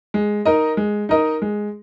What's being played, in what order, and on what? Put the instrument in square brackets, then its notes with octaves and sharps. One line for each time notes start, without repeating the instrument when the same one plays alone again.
[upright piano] G#3
D#4 A#4 D#5
G#3
D#4 A#4 D#5
G#3